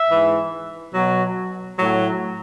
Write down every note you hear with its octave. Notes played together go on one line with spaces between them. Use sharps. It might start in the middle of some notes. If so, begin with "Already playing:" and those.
Already playing: E5
G#2 E3
B2 F#3
A2 F#3